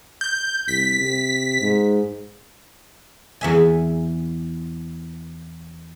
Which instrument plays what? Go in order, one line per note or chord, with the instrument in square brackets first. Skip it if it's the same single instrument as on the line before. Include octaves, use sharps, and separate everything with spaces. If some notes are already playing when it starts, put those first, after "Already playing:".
[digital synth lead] G6
[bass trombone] C2 [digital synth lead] B6
[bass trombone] C3
G#2
[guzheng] E2 E5 G#5